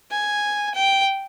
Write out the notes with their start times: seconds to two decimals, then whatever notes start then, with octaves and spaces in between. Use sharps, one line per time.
0.11 G#5
0.74 G5